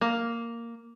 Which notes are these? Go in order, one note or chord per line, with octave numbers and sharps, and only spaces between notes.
A#3